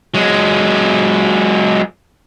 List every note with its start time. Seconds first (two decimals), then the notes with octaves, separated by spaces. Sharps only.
0.14 F#3 G#3